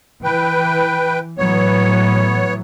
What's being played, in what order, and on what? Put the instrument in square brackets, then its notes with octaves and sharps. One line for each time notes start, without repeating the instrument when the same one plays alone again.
[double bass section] E3 [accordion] B4 G5
[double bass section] A2 E3 F#3 [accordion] B3 C#5